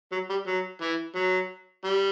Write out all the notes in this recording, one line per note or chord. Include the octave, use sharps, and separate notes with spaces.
F#3
G3
F#3
E3
F#3
G3